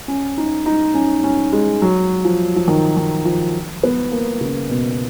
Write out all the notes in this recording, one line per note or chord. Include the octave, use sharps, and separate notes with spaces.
C#4
D#4
D#4
C#4
C#4
G#3
F#3
F3
F3
D#3
D#3
F3
B3
A#3
C#3
B2